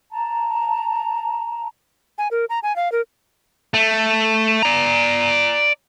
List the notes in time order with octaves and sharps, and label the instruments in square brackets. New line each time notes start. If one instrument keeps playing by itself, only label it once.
[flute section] A5 A#5
[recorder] G#5
A#4
A#5
G#5
F5
A#4
[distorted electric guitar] A3
D5 A#5